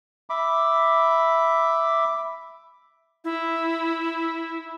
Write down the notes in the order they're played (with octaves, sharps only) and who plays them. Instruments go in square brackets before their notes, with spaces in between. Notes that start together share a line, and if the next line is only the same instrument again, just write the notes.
[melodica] E5 B5 D6
[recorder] E4